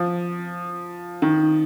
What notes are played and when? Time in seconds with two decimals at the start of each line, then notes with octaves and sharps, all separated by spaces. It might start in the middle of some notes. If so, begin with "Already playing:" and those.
Already playing: F3
1.22 D#3